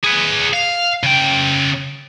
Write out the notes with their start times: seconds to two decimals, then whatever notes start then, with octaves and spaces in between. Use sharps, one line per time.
0.04 G#4 B4
0.54 F5
1.04 C#3 G5